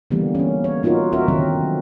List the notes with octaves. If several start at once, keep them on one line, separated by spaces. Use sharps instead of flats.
D3 E3 G3 A#3 B3
A#3 C#4
C#5
A#3 D#4 F4 F#4 A#4
C4 F#4 A#4 E5
D3 D#3 F#3 C4